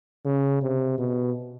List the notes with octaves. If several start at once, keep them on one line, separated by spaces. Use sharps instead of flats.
C#3
C3
B2